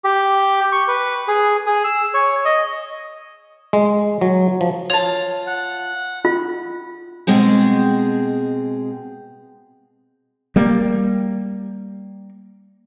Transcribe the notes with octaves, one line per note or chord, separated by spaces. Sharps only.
G4
C#6
B4
G#4
G#4
E6
C#5
D#5
G#3
F#3
F3
F4 C#5 A5 F7
F#5
F4
B2 G#3 C4 G#4
G3 A#3